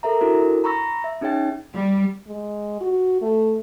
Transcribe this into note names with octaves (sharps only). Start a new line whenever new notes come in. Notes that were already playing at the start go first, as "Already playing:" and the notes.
A4 A#4 E5 A#5
D4 E4 F#4 A4 A#4
A#5 B5 C#6 E6 A#6
E5
C#4 D#4 G#4 C#5 G5 A6
G3
G#3
F#4
A3